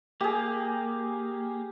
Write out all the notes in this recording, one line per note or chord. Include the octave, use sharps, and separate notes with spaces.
A#3 G4 G#4